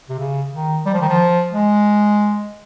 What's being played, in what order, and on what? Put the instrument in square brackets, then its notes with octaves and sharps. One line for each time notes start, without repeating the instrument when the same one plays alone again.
[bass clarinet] C3
C#3
D#3
G3
F3
D#3
F3
G#3